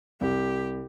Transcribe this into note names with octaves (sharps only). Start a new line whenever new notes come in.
C2 G4